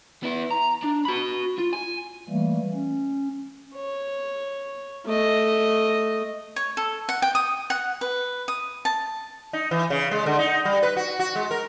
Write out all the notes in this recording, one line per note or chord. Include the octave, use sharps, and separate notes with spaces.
B3 E4
A#5
D4
F#4 B5
F4
G#5
E3 G3 A3 A#3
C#4
C#5
A3 D#5
C#5
A4
F#5
G5
D#6
F#5
B4
D#6
A5
D#4
E3
C#3
G#3
D3
D#4
G3
B4
F#4
F#4
G#3
A#4